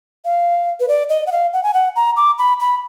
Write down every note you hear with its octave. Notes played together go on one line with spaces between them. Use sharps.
F5
B4
D5
D#5
F#5
F5
F#5
G#5
F#5
A#5
D6
B5
B5